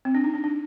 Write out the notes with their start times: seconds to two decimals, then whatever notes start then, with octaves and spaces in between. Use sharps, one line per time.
0.05 C4
0.15 D4
0.24 D#4
0.34 D4
0.44 D4